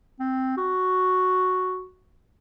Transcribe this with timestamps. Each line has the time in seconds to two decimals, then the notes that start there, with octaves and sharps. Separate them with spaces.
0.19 C4
0.57 F#4